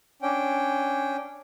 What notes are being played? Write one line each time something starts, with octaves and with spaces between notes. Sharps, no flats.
C#4 D4 G5